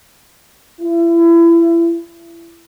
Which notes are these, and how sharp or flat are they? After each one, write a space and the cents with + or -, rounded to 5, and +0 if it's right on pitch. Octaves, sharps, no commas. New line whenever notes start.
E4 +30